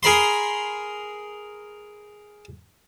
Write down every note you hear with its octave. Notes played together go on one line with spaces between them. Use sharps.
G#4 A#4 B5 C6